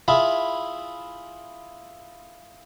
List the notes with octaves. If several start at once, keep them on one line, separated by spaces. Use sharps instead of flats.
E4 F4 G#4 E5 B5